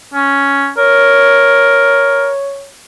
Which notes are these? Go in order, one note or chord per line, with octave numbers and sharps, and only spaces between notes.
C#4
A#4 C#5